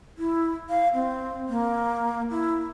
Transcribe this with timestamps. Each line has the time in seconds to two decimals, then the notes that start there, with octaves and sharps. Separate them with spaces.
0.18 E4
0.70 F5
0.94 C4
1.49 A#3
2.30 E4